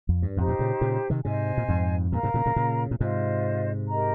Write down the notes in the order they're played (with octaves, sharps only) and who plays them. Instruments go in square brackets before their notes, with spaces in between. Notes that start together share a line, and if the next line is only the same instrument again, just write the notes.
[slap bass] F2
G2
[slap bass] F2 G#2 [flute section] D#4 G4 C5
[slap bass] G2 A#2
A#2 C#3
A#2 C#3
C3 D#3
[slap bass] G#2 C3 [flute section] C5 D#5 G#5
[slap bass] A#2
F2 G#2
[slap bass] G2 A#2 [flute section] A#4 F5 A#5
[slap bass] G#2 C3
A#2 C#3
A#2 C#3
A#2 C#3
A#2
[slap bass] G#2 C3 [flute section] F4 C5 D#5
[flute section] G4 A#4 D#5 A#5